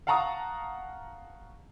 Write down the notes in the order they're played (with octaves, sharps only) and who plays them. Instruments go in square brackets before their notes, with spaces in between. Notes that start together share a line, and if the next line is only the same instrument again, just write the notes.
[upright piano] F5 F#5 A5 A#5 C#6 D#6